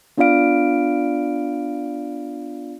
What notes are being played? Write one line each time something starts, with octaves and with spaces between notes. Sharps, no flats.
B3 D4 F4 D5 F5 D7